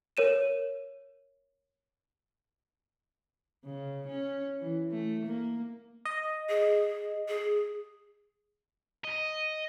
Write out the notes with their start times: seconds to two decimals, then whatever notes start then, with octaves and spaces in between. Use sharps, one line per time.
0.17 A#4 C#5 D#7 E7
3.65 C#3
4.07 C#4
4.60 E3
4.91 A3
5.25 A#3
6.05 D#5
6.49 G#4
7.28 G#4
9.05 D#5